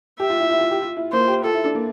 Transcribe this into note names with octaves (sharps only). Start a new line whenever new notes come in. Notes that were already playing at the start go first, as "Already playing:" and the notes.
G4 E5
F4
E4
E4
F4
G4
F4
E4
A#3 C5
F4
G4
F4 A4
E4
D4
A#3